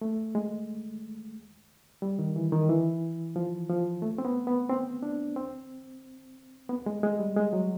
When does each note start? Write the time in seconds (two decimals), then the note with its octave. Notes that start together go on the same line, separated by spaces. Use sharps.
0.01 A3
0.35 G#3
2.02 G3
2.19 D#3
2.36 E3
2.52 D#3
2.69 E3
3.36 F3
3.70 F3
4.02 A3
4.18 C4
4.25 B3
4.47 B3
4.69 C4
5.03 D4
5.36 C4
6.69 B3
6.86 G#3
7.03 G#3
7.20 G3
7.36 G#3
7.53 F#3